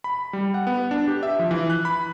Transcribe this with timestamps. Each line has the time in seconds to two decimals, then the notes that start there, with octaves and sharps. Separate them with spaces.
0.04 B5
0.33 G3
0.54 F#5
0.67 B3
0.91 D4
1.08 G4
1.23 E5
1.39 F3
1.51 E3
1.70 F#6
1.85 B5